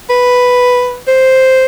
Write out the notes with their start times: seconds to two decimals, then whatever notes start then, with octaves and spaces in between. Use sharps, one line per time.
0.10 B4
1.08 C5